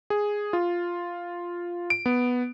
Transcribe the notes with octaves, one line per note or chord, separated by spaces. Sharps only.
G#4
F4
D7
B3